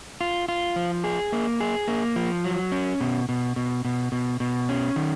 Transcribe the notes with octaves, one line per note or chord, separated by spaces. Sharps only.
F4
F4
F3
G#4
A#3
G#4
A#3
F3
F#3
C#4
B2
B2
B2
B2
B2
B2
C#4
D#3